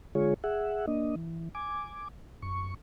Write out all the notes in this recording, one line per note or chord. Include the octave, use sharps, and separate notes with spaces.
D3 G#3 F4 G#4 C#5
G#4 E5 F#5
A#3 D4 D#5
E3
G#5 D6
F#2 C#6